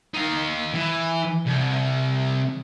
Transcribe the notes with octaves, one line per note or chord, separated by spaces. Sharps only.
D#4 F5
E3
C2